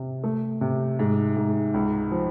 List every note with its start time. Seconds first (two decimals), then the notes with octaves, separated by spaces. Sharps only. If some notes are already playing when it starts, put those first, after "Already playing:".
Already playing: C3
0.24 A3
0.61 C3
0.99 G#2
1.36 G#2
1.74 C#2
2.12 F3